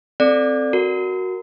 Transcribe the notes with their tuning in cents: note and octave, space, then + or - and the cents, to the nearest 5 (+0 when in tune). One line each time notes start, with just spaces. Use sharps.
C4 +0 A4 +0 D5 +10
F#4 +0 A#4 +0